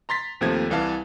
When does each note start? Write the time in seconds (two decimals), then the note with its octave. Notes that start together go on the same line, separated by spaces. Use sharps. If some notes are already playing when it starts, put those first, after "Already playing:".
0.09 A#5 C6 A6 B6
0.41 D#2 C3 F3 A3 G#6
0.70 C2 E3 B4 F5 A5